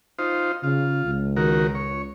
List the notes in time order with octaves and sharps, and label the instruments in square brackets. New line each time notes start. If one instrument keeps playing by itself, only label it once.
[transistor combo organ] D#4 F4 C5
[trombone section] C#3 [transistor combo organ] F4
[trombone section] C#2
[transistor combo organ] D#3 F#4 A#4
C#5